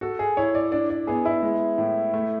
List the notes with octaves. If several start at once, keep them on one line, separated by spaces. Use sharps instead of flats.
F#4 A4
G#4
E4 C#5
D5
D4 D5
D5
B3 G#4
E4
G#3
A2
A3